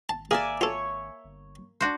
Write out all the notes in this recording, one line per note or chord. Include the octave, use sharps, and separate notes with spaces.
G#1 A5
A#3 G#4 D5 E5 G#5
F4 A4 C#5
G1
G1 D4 F#4 C5